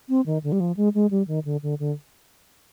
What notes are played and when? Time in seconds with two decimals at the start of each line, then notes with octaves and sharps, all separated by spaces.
0.09 C4
0.26 D#3
0.44 D3
0.52 G3
0.60 F3
0.77 G#3
0.95 G#3
1.11 G3
1.28 D#3
1.45 D3
1.63 D3
1.79 D3